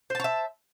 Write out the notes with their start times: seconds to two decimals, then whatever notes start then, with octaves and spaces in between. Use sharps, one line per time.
0.10 C5
0.15 A5
0.20 C#5
0.24 E5